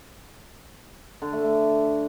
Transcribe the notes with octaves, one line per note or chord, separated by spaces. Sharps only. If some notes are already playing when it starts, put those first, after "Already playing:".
D3
A3
A3